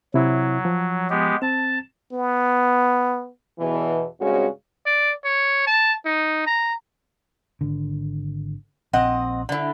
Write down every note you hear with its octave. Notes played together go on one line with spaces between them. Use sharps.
C3 F#3 E4
F3
G#3 B3 G4
C4 A5
B3
E2 B2 E3
G2 C#3 G#3 C4 C#4 F#4
D5
C#5
A5
D#4
A#5
G#1 D3
A#1 C4 D#5 F#5
D3 E4